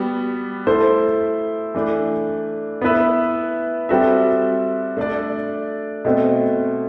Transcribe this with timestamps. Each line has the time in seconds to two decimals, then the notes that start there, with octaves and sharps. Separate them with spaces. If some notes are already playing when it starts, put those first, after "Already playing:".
Already playing: G3 B3 F#4
0.67 A3 E4 A4 C5
1.74 E3 A3 D4
2.82 B3 E4 B4 E5
3.89 G3 C4 F#4 A4 E5
4.97 A3 D4 A4 D5
6.05 B2 A3 C4